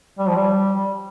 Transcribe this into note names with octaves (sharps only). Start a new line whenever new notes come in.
G3
F3
G3